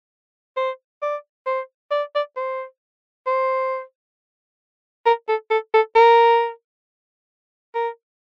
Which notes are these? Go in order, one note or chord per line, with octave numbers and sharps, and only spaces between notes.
C5
D5
C5
D5
D5
C5
C5
A#4
A4
A4
A4
A#4
A#4